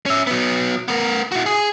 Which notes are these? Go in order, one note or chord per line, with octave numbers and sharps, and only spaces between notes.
C#4 E5
F#3 B3
B3 A#4
E4 F#4
G#4